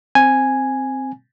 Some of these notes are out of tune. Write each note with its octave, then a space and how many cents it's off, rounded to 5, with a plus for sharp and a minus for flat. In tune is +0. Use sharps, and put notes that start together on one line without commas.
C4 +5 G#5 +0